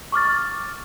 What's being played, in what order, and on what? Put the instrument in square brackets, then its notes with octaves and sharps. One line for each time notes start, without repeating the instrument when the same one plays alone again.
[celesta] C#6 D6 F6 A6